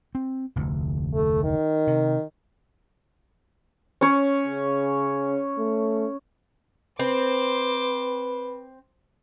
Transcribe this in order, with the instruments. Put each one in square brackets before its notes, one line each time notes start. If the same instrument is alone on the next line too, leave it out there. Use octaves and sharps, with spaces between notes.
[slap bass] C4
F1 D2
[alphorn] A3
D#3
[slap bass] C3
[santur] C#4 C#5
[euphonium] C#3
A3
[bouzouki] C4 [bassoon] B4 [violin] C5 D6